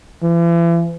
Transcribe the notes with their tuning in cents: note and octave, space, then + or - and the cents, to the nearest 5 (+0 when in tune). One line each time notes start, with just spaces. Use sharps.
E3 +40